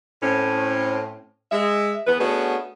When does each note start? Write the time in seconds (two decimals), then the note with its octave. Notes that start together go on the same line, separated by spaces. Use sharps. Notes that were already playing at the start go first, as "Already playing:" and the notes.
0.22 A2 C4 C#4
1.52 G#3 E5
2.07 E2 B3 B4
2.20 A3 B3 C#4 D4 F#4 G#4